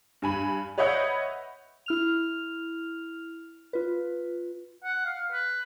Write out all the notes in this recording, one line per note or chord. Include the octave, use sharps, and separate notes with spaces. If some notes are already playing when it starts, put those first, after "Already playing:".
G2 G#5 B5
B4 C#5 D#5 E5 F#5 G6
E4 F6 F7
F4 B4
F#5
F5
B4